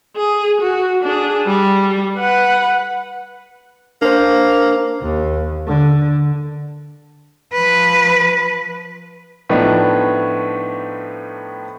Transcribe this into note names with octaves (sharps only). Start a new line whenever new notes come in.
G#4
F#4
D4 G#4
G3
B4 F#5
A#3 D4 C5
D#2
D3
F3 B4
A2 F3 A3 B3 D4 D#4